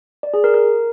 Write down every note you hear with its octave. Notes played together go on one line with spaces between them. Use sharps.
D5
G#4
A#4
A#4